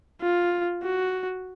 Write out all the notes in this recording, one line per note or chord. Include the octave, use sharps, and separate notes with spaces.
F4
F#4